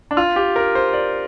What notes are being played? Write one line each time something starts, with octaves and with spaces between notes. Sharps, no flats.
D4
F4
G4
A#4
C5
D5